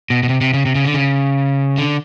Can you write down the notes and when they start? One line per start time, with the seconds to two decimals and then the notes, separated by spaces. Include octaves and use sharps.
0.10 B2
0.23 B2
0.29 C3
0.41 C3
0.53 C#3
0.66 C3
0.75 C#3
0.85 D3
0.94 C#3
1.78 D3